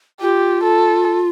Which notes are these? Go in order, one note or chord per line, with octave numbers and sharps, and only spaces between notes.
F4 G4
A4